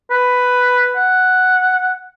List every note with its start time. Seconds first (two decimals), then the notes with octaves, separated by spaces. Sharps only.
0.10 B4
0.96 F#5